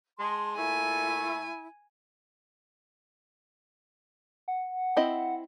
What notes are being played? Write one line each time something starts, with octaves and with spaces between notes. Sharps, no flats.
G#3 A5 C6
A#2 A3 E4 G#5
F#5
C4 E4 D#5